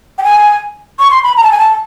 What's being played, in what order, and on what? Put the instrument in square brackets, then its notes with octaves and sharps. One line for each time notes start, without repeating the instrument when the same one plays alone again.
[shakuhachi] G5
G#5
C#6
C6
B5
A#5
A5
G#5
A5